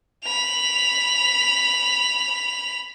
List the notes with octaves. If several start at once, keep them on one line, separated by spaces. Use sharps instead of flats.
B5 F7